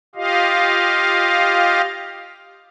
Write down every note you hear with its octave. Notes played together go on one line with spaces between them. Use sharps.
F4 G4 D#5 F5